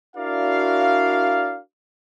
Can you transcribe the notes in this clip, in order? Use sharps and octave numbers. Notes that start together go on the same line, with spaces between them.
D4 E4 F#4 A#4 D5 F5